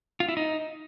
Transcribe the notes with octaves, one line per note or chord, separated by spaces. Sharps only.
F4
E4
D#4